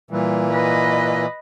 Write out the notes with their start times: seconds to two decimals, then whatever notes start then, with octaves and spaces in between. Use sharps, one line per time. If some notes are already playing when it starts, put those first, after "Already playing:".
0.11 A#2 E3 G3
0.53 B4 D#5